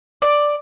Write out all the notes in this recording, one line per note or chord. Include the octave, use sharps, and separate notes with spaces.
D5